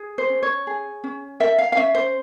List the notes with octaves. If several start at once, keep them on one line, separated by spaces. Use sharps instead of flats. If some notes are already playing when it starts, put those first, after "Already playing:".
Already playing: G#4
C5
C#4
C#5
G#4
C#4
A#4 E5
F5
F5
C#4 E5
C5